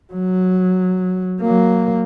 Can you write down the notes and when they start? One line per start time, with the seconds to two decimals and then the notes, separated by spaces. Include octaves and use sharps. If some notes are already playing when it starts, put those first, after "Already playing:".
0.13 F#3
1.42 F#3 A#3